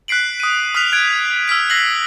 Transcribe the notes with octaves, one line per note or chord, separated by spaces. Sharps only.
F#6 B6 C7 D7 F#7
D#6 D#7
D#6 F6 F#6 B6 F7
F#6 G#6 D7
E6 F6 B6 D7
E6 A#6 C7 F#7